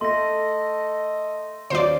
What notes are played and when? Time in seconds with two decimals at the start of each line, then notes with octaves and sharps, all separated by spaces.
0.01 A3 A4 D#5 C6 A#6
1.70 D#2 F3 C#4 C5 D5